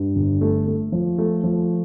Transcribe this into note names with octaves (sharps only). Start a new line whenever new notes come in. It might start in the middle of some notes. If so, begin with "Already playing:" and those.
Already playing: G2
G1
A3
A3
F3
A3
F3